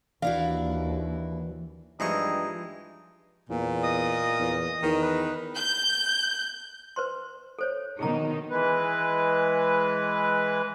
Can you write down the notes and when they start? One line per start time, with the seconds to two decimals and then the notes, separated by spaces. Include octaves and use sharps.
0.22 D#2 E3 D4 E4 F#4 F5
2.00 G2 E3 F3 G#3 D#4 C#6
3.49 E2 A#2
3.83 D#5 D#6
4.39 E2
4.83 E2 D#3
5.02 B4
5.56 G6
6.96 B4 C5 C6
7.59 A4 C5 C#5
7.99 B2 D#3 D#4 G#4 A#5
8.49 E3 G#3 B4